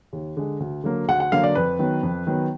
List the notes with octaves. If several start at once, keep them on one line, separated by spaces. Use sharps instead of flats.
D#2
D3 G#3
D2
D3 F#3 A#3
D2 F#5
F#5
D3 F#3 A#3 F5
D5
F2 B4
D#3 F#3 B3
F2
D#3 F#3 B3